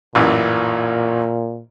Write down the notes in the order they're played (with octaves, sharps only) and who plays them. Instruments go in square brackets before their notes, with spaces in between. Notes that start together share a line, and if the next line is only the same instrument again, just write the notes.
[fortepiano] A1 F#2 E3 [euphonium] A#2